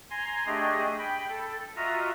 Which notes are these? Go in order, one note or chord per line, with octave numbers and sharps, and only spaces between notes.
G#5 A#5 C6
A3 D4 G4 G#4 D#5
G5 B5
A4
F4 F#4 D#5 E5 A#5